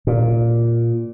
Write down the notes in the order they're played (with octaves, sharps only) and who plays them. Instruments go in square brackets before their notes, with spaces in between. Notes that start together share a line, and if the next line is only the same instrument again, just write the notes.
[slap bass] A#2